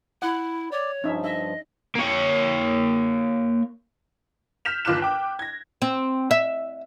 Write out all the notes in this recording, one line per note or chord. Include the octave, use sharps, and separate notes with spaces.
E4 F#5
C#5 D5
G2 F3 C#4 D#4 E5
D#5 E5
A#3 C#5
F6 G6 B6 E7 F7
G1 D#2 F4 D6 F#6 E7
G5 D6
G#6 A#6
C4
E5